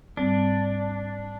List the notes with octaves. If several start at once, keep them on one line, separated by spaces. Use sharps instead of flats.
G#2 G3 C4 D4